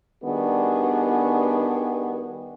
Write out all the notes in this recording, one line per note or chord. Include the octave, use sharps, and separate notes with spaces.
D#3 G3 B3 D4 F#4 G#4